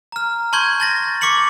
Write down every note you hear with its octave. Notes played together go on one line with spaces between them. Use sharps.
A#5 F6
A5 C6 C#6 G6 G#6
A5 A6 A#6
C#6 D6 B6 C#7 F#7